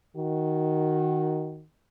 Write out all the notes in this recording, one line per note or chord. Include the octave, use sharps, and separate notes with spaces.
D#3 F#4